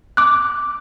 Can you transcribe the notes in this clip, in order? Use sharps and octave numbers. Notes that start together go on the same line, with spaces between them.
D6 F#6